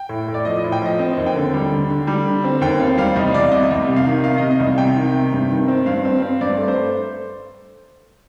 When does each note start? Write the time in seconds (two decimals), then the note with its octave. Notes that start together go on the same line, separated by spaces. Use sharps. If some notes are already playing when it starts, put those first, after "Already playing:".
Already playing: G5
0.09 A2
0.28 A2
0.34 D5
0.45 F3 D#5
0.59 A2 D#5
0.72 G5
0.82 F3 D#5
0.99 C4 D#5
1.17 D#2
1.26 G5
1.36 D3
1.53 G3
1.72 D3
1.90 D3
2.07 G3
2.26 D3
2.44 C4
2.61 D#2 G5
2.80 C4 F5
2.98 G3 F5
3.16 C2 D#5
3.34 C2 D5
3.51 C3 D#5
3.71 C2
3.88 C3
3.96 F5
4.06 D#3
4.24 C3 F5
4.38 D#5
4.42 C3
4.51 D#5
4.60 C2
4.78 C3 G5
4.96 D#3
5.14 C3
5.32 G2
5.51 D#3
5.68 C4
5.86 G2 F5
6.05 C4
6.22 C4
6.41 G2 D5
6.58 A3
6.68 C5